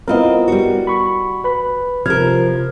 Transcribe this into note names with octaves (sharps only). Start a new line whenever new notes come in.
B3 C4 E4 F4 A#4 D#5
G3 F#4
B5 C#6
B4 B5
C3 F3 A#4 F6 G#6